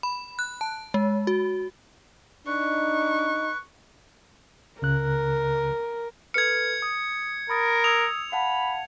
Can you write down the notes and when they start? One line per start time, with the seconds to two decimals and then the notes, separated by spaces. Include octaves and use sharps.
0.03 B5
0.39 F#6
0.61 A5
0.94 G#3
1.27 F#4
2.47 D4 D#4 B4 C#6
4.82 C#2 C#3 A#4 F#6
6.34 A4 B4 F6 G#6 C#7
6.82 D#6
7.50 A#4 B5 D#6 A6
7.84 D#6 E6 G#6 F7
8.32 F5 F#5 A5 B5